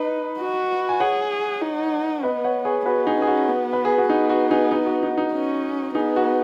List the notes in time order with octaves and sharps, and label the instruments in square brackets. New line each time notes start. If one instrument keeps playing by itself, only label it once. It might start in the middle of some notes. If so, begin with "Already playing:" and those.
Already playing: [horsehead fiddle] D#4 [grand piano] B4 D#5
[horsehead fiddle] F#4
[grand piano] G#5
[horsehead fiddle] G#4 [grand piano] C#5 F#5
[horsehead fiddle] D#4
[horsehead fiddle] B3 [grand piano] B4 D#5
[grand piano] C#5 F#5
G#4 C#5
[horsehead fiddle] B3 [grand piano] F#4 B4
[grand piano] D#4 G#4
[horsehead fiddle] C#4
[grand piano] G#4
F#4
[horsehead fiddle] B3
[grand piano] B4
G#4
F#4
[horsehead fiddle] B3 [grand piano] D#4
[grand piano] F#4
D#4 G#4
D#4
F#4
D#4
D#4
[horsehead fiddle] C#4
[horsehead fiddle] B3 [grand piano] D#4 G#4
[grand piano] F#4